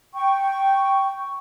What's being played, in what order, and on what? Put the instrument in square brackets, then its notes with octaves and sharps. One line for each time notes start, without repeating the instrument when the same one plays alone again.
[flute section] G5 C#6